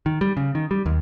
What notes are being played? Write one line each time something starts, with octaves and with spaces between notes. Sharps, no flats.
D#3
G3
C#3
D#3
G3
D#2